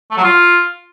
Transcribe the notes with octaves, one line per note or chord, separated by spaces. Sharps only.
A3
F#3
F4